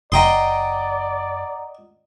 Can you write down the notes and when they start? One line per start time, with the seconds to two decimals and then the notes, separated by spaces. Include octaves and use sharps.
0.12 F#1 D5 D#5 F#5 G5 A#5 C6 D#6